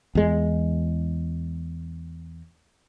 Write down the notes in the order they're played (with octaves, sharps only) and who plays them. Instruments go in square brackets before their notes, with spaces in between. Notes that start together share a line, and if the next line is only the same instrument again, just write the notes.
[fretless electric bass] E2 G#3